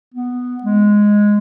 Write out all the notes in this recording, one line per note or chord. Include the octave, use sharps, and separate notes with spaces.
B3
G#3